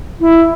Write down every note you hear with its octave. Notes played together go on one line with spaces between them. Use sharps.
E4